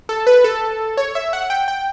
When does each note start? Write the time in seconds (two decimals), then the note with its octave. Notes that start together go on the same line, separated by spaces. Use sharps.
0.09 A4
0.27 B4
0.44 A4
0.97 C#5
1.15 E5
1.33 F#5
1.50 G5
1.68 G5